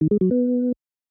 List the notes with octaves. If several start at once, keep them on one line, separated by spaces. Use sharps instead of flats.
D#3
G#3
F#3
B3